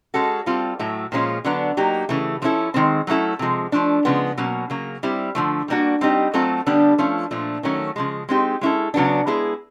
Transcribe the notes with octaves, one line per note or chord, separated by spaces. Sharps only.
G#3 C#4 F#4 A4
G3 C4 F4 A4
A2 F#3 A3
A#2 F3 G#3 C#4 F4
D3 F#3 B3 D4
F#3 A#3 D#4 G4
C#3 E3 A3
F3 A3 C#4 E4 A4
D#3 G#3 C4
F#3 A3 C#4 E4 A4
C3 F3 G#3
F3 A3 D4
C#3 F3 G#3 B3
B2 F#3 A#3 C#4
C#3 F#3 A#3
G3 C4 E4
D3 F3 A3
G3 A#3 D4 F#4
G3 C4 D#4 G4
F#3 A3 C4 F4 A4
D3 G3 B3 D4 G4
F3 A3 C#4 F4
A#2 F3 A3 D4
D#3 F#3 A3 C#4
C#3 F3 G#3
G#3 C4 D#4 G4
G#3 C#4 E4 A4
C#3 F#3 B3 D4
G#3 B3 E4 G#4